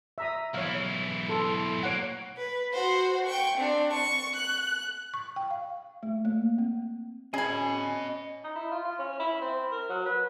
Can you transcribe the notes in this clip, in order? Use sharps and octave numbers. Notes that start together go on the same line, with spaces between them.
E5 A#5 D#6
B1 E3 C#5 F5
A4 C6
A#3 C#5 F#5
B4
F#4 C5
G5 C#6
C4 D4
C#6
F#6
C#6
G5
F5
A3
A#3
C4
C#4 G#4 D#5 G#5 B5
D#4
E4
F4
F4
C#4
E4
C4
A#4
F#3
B4